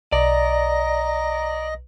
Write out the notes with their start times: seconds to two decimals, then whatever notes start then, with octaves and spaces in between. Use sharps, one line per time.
0.12 B1 D5 D#5 A#5